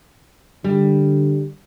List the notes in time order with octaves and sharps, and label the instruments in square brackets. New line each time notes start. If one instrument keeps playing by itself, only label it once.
[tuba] D3 [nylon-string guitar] G3